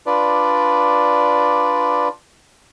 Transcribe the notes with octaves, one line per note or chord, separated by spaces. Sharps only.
D4 F4 B4 D5